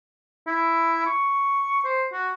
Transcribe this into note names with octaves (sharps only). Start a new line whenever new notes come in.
E4
C#6
C5
F#4